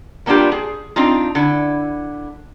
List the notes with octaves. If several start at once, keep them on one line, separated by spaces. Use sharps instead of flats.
G3 A#3 B3 D4 F4 G4
G#4
C4 D4 D#4 F4
D3 E4